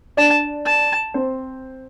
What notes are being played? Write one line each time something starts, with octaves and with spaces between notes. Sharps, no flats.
D4 D5 A5
A5
C4 C5